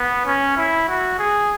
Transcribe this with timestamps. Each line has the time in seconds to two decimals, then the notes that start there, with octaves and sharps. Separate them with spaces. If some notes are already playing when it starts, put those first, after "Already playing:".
Already playing: B3
0.26 C#4
0.57 E4
0.89 F#4
1.19 G#4